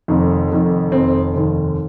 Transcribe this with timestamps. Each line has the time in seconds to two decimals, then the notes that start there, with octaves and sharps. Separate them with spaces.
0.08 F1 F2 D#3
0.50 F1 F2 D#3
0.92 F1 F2 D#3 C4
1.35 F1 D#2 D#3